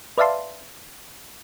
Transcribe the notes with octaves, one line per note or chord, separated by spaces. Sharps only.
B4 D5 E5 F5 A5 C6